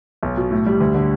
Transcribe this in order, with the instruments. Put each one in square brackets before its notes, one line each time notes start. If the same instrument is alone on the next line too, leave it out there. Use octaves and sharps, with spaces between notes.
[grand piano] B1
B2
A2
G3
D2
D3